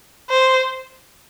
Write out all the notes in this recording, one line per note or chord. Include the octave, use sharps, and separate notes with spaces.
C5